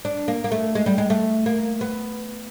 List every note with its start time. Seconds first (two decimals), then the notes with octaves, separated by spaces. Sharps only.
0.05 D4
0.28 A#3
0.44 A#3
0.52 A3
0.75 G#3
0.86 G3
0.98 G#3
1.10 A3
1.46 A#3
1.81 B3